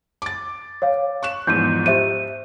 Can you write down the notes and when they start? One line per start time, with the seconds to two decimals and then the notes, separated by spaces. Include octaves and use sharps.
0.22 D6 A6
0.82 C#5 F5
1.23 C#6 F#6 E7
1.47 E2 G#2 F3 G6 D#7
1.86 G4 C5 E5 D#7